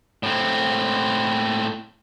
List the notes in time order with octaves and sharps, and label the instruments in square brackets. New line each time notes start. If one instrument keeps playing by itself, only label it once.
[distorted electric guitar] A2 C4